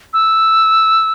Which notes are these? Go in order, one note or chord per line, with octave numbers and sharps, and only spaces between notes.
E6